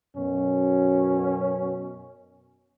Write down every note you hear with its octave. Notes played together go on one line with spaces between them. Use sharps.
F#2 B2 C#4